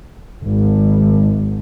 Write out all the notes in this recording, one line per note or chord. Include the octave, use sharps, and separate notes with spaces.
G#1